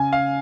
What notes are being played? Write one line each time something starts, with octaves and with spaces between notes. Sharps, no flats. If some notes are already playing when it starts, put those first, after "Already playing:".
Already playing: C#3 G#5
F5